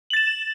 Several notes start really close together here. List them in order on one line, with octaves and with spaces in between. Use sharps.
F#7 A6 E7